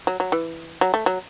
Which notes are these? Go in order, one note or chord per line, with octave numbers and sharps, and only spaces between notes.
F#3
F#3
E3
F#3
A3
F#3